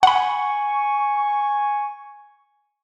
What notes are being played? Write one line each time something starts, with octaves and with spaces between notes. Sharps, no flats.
F#5 G#5 B5 C#6